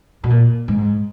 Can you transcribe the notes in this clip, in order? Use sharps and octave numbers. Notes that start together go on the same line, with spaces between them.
B2
A#2
G#2